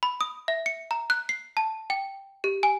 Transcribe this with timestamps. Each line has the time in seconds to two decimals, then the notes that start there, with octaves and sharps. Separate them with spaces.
0.03 B5
0.21 D#6
0.48 E5
0.66 C#7
0.91 A#5
1.10 F#6
1.29 C7
1.57 A5
1.90 G5
2.44 G4
2.63 G#5